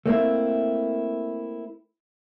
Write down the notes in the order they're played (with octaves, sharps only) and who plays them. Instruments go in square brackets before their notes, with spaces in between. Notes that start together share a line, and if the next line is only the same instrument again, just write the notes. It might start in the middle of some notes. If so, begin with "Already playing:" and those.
[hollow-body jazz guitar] A3 A#3 C4 E4